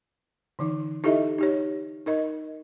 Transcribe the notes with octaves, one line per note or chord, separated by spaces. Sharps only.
D3 E3 D#4
D#4 E4 G4 A4 D#5 E5
D#4 G4 C#5
D#4 A#4 D#5